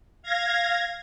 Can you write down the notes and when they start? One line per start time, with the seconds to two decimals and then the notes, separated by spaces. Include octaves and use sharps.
0.22 F5 G#6 A#6